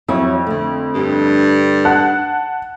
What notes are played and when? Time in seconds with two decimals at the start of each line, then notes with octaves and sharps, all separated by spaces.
0.08 F2 F#3 E4 C#5
0.47 D3 A3
0.94 G2
1.85 F#5 A5 F#6